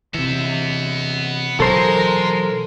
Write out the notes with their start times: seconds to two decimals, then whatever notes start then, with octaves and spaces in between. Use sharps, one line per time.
0.14 C3 E3 B3 E5
1.60 B2 E3 F#3 G#3 A4 A#4 C5